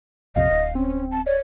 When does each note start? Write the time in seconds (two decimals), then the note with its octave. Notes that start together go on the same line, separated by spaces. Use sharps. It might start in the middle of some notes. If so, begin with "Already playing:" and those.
0.36 A#1 F2 C3 D#5 F5
0.50 D1
0.75 C4 C#4
1.11 A5
1.26 C#5 D5